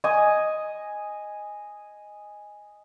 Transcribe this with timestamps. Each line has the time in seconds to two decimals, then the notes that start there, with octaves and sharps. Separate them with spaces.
0.04 D#5 G#5 D#6